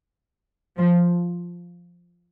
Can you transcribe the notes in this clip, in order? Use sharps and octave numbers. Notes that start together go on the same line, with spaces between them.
F3